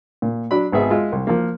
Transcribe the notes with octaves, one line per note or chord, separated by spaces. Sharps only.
A#2
F#3 D4 B5
G#1 B3 G#4 E5
G#3 F4 E5
C2
F3 A#3